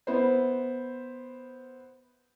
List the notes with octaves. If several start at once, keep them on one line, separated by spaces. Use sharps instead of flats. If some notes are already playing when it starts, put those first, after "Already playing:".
B3 E4 C5